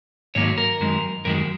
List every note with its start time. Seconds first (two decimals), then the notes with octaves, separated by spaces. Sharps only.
0.35 G#2 D#3 F#3 A#3 C#5
0.58 A#4
0.80 F#2 D#3 G#3
1.25 F#2 D#3 G#3 A#4